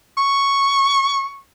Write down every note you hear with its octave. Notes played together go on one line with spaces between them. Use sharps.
C#6